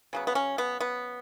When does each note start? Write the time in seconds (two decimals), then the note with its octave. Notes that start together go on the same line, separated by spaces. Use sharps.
0.13 C#3 F#3 B3
0.27 B3
0.35 C#4
0.58 B3
0.80 B3